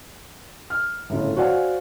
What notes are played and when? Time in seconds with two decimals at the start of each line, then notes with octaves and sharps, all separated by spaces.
0.70 F6
1.10 G1 A2 C#3 F4
1.36 F#4 C5 D5 F5 F#5 G#5